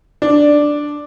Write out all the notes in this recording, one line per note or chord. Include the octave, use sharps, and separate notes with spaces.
D4